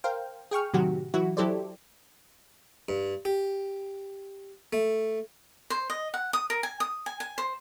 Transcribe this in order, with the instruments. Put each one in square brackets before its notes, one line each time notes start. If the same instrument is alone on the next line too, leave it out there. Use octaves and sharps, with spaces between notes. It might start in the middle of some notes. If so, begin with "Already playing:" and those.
[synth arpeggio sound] A#4 C5 F5 G5
G#4 G5 C#6 F6
A2 C3 D#3 F#3 F#4 G4
E3 F#3 E4 F#4
F#3 E4 G4 A4 C5 D5
[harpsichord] G2
G4
A3
[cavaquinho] C5
D#5
F#5
D#6
A#4
G#5
D#6
G#5
G#5
C5